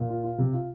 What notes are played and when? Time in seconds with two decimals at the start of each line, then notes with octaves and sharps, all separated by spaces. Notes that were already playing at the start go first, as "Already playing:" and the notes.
Already playing: A#2
0.09 F4
0.23 F4
0.38 C3
0.53 F4